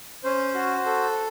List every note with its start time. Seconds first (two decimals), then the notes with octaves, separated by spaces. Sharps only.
0.24 C#4 C5
0.54 F#4
0.86 A4